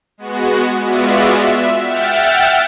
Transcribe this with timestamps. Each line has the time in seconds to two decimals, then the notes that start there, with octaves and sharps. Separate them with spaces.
0.18 G#3 B3 F#4
0.83 G#3 B3 F4 F#4 D5 E5
1.43 E5
1.82 E5 F#5 G5 E6 F6 A6